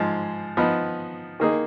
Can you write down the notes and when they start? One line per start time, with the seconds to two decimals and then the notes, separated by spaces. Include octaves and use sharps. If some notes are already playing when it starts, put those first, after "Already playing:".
Already playing: G#2 F3 G#3
0.57 F3 B3 D#4
1.40 D#3 A#3 D#4 G#4